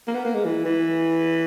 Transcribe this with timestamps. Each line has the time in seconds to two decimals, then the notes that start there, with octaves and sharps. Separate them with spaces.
0.07 A#3
0.15 B3
0.25 A#3
0.34 G#3
0.45 E3
0.65 E3